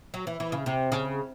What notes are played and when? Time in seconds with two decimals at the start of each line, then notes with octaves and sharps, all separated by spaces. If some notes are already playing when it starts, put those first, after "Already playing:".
0.14 F#3
0.27 E3
0.40 E3
0.52 C#3
0.66 C3
0.92 C#3